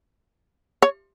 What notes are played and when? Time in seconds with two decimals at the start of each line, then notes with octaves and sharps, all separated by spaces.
0.82 C#5